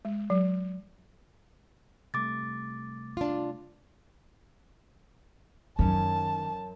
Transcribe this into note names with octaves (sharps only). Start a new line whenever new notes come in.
G#3
F#3
C3 G3 A3 D6 A6
D4 F4
F#2 D#3 C#4 A5